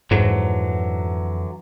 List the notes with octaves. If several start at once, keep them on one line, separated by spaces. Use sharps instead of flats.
F2 G#2 D3 E3 F#3